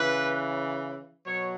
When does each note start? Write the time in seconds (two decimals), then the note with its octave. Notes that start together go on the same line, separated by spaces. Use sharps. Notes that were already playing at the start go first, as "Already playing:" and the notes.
Already playing: C#3 E3 B4
1.26 B2 F#3 C#5